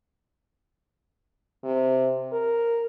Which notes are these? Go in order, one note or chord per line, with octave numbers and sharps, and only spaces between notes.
C3
A#4